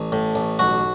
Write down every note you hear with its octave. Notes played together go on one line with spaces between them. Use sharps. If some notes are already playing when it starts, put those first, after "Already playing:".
Already playing: A1
A2
A1
B1 F#4